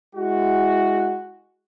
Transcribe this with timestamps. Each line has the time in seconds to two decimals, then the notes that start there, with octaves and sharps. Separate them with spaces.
0.15 G#3 E4 F#4